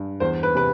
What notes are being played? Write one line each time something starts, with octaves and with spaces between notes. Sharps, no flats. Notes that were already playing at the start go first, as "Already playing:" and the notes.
Already playing: G2
E2 C5
B4
C3 B4